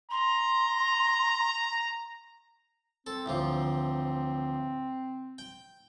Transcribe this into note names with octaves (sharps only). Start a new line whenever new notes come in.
A#5 C6
C4 A4
A1 D2 F3
G5